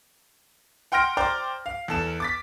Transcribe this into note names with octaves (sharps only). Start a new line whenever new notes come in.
F#5 G5 C6 F6 A#6 D7
C5 D5 G5 A#5 C6 D6
F5
E2 A4 E7
D6 A6 B6